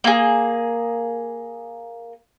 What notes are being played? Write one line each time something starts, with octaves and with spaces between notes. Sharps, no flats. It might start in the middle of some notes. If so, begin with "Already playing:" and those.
A#3 G#4